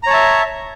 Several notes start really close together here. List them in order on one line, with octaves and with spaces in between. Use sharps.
A#5 C#5 A5 E5